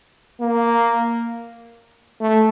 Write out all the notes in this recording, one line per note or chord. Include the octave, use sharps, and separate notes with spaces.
A#3
A3